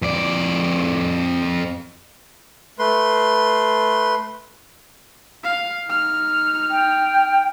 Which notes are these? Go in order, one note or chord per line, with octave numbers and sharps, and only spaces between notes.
F2 D5
A3 B4 C6
F5
D#4 F6
G5